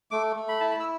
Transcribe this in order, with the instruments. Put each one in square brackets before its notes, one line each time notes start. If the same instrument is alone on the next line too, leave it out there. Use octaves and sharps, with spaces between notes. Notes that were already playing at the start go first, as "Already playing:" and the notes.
[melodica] A3 D6
A3
B5
E4 A5
B5
E6